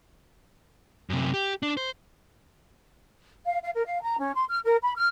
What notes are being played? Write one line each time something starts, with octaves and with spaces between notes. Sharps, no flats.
F#2 C3
G4
D4
C5
F5
F5
A#4
F5
A#5
C#4
C6
F6
A#4
B5
F6